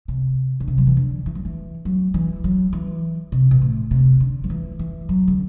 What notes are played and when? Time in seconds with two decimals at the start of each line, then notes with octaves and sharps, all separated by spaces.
0.08 C3
0.60 D3
0.68 C3
0.78 F#3
0.87 E3
0.97 D3
1.26 E3
1.35 F#3
1.45 E3
1.85 F#3
2.14 E3
2.44 F#3
2.73 E3
3.32 C3
3.51 B2
3.62 A2
3.91 C3
4.20 D3
4.44 F#3
4.50 E3
4.79 E3
5.09 F#3
5.28 D3